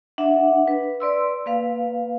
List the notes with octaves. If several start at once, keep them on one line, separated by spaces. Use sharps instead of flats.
D4 E5 F#5
B4
B4 D5 C6 E6
A#3 B4 F5